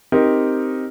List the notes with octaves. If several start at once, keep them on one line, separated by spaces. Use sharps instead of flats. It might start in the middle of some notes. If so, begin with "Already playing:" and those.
C4 D#4 G4 A#4